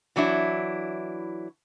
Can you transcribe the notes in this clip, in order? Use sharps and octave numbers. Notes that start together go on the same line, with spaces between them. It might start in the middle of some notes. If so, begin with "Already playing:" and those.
E3 F#3 D4 E4